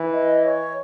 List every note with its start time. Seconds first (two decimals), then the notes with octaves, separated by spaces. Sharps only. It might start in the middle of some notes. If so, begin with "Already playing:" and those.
Already playing: E3
0.13 D#5
0.44 C#5